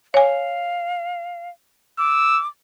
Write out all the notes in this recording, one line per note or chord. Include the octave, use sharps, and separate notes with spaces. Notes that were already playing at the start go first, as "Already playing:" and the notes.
C#5 F5 G#5
D6 E6